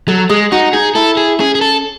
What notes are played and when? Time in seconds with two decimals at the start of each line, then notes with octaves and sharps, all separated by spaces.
0.08 F#3 A4
0.29 G#3 G#4
0.52 D#4 F#4
0.73 D#4 G#4
0.95 E4 A4
1.17 G#4
1.39 C#4 G#4
1.55 G#4
1.61 A4